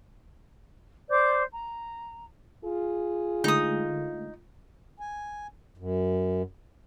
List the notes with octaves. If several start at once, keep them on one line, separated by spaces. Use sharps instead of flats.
C5 D5 D6 G6
A#5
F4 G#4
D3 G#3 A3 D#4 D#6
G#5
F#2